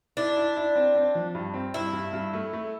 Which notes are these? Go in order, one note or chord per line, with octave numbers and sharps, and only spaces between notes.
D4 E4
E4
E4
C4
C4
F3
G2
C4
G2 E4
G2
G2
A3
A3